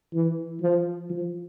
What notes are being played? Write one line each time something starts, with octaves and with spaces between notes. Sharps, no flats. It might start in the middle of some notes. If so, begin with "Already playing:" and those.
E3
F3
F3